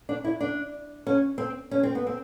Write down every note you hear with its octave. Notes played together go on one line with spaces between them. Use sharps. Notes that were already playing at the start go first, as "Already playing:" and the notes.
D4
E4
D4
C#4
C4
C#4
C4
B3
C4